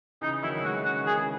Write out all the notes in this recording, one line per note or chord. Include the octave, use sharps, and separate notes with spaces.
C#3 E3 D#4
D#3 F#3 E4
F#3
E3 G#3 F#4
C#3 E3 F#4
D#3
G#4
C#3 E3